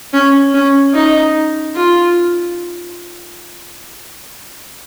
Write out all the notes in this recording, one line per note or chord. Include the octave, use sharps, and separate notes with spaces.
C#4
C#4
D#4
F4